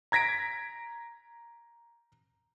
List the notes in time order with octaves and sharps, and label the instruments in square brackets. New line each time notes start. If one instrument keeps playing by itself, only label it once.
[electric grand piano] A#5 G#6 A#6 B6 D7